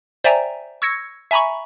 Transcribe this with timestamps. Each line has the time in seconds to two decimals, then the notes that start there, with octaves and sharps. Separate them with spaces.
0.24 C5 D5 E5 G5 G#5 A#5
0.82 C#6 E6 G#6 A#6 C#7
1.31 E5 G#5 A#5 B5 C#6